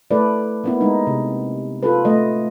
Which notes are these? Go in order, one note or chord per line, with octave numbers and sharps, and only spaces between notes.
A3 E4 A4 B4 D5
A#3 B3 E4
G#3 D#4
C3
F4 A4 B4
A3 D#5